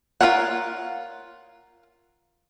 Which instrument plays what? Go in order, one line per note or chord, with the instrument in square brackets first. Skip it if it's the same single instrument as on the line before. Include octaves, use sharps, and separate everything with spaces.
[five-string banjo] F4 G#4 A#4 C#5 F#5